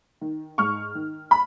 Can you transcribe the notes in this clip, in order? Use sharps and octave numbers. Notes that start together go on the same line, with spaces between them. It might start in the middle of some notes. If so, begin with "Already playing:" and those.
D#3
G#2 C#6 F6
D#3
B5